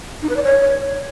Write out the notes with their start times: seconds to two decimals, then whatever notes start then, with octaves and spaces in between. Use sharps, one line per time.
0.22 D#4
0.29 B4
0.36 D5
0.44 C#5